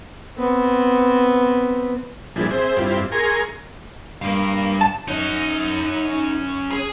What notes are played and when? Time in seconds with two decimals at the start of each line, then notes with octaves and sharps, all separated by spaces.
0.37 B3 C4
2.36 A#2 F3 G3 D4 E4 G#4
2.51 C4 G#4 C5 E5
2.77 G2 C4 E4 F4 G4
3.12 G#4 A#4 G#5 A#5 C6 C#6
4.22 G2 A#4 F5
4.81 A5
5.08 C#4 D#4 F#4
6.71 G#4